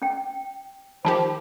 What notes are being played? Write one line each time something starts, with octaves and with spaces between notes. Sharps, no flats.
C#4 G5
D#3 F3 G4 C5 A5 B5